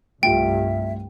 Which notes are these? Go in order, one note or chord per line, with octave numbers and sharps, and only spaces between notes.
C2 G2 A3 F4 G4 E5 G5